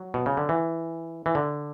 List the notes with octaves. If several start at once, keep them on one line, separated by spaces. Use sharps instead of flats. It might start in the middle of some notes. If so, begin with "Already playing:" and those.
Already playing: F#3
B2
C#3
D3
E3
E3
D3